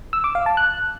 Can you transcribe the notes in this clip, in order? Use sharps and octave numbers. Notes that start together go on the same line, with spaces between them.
E6
D6
F5
A5
F#6